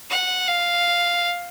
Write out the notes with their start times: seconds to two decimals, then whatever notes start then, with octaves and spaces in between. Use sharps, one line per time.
0.10 F#5
0.48 F5